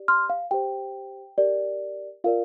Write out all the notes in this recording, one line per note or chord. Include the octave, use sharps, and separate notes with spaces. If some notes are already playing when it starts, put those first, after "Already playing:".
Already playing: G4 D5
C6 F6
F5
G4 C5 G5
G4 A#4 D5
F4 A#4 D5 F5